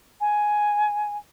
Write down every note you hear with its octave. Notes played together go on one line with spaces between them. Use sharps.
G#5